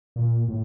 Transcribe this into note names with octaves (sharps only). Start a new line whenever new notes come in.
A#2
A2